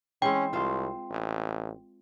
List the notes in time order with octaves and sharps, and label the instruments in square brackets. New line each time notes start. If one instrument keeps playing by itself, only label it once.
[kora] E3 G#3 C4 [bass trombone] C#4 [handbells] G5
[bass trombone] C2 [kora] F4 C5
[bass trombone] A1